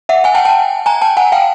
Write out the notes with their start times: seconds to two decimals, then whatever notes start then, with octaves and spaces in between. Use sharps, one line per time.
0.09 E5 F#5
0.24 F#5 G#5
0.35 G5 A5
0.45 G5 A5
0.86 G#5 A#5
1.02 G5 A5
1.17 F#5 G#5
1.32 F5 G5